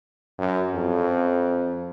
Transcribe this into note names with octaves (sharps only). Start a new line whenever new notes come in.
F#2
F2